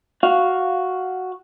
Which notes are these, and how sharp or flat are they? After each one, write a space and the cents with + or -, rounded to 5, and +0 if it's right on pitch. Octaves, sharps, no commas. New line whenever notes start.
F#4 +0 F5 +0